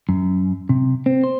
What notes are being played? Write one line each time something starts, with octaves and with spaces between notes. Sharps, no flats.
F#2
C3
C4
C5